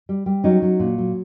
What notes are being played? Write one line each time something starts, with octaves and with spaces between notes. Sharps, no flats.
G3
G3
F#3 C#4 D#4
F#3
A#2
F#3